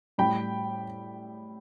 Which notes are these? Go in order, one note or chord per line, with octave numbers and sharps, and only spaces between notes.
A2 G3 G5 B5